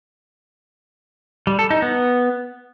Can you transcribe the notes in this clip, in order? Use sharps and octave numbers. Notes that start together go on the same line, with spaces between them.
G3
A4
D#4
B3